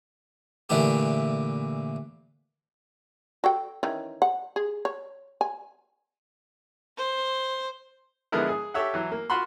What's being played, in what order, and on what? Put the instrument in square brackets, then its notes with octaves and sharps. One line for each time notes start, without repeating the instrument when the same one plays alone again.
[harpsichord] A#2 D3 E3 A3 G4
[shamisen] F#4 A4 G5
D#3 E3 C#4
F#5
G#4
C#5
G#5
[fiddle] C5
[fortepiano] D3 F3 G#3 B3 E4 A#4
G#4
G4 A4 C#5 E5 F#5
E3 F#3
A#3
F4 F#4 F#5 B5 C6